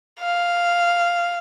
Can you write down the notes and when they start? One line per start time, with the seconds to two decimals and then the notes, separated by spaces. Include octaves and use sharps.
0.20 F5